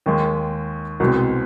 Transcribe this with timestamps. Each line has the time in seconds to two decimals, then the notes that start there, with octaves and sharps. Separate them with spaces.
0.06 D#2 D#3 G#3
1.00 C2 B2 G#3 C4